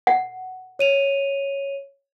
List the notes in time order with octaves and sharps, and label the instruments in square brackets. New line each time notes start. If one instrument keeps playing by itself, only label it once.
[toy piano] F#5
[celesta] C#5 D#7 F7